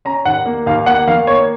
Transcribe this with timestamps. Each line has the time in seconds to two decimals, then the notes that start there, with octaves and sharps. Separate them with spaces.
0.05 C#4 A#5
0.25 D#2 F#5
0.46 A#3
0.66 D#2 F5
0.86 A#3 F#5
1.07 D#3 F5
1.27 A#3 C#5